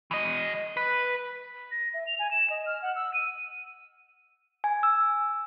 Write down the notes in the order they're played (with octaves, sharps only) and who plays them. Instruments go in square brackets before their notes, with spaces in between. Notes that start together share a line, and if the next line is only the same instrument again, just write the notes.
[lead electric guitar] E3 D#5
B4
[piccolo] A#6
E5
F7
G#5
E7
D#5
F6
F#5
E6
D#7
[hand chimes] G#5
E6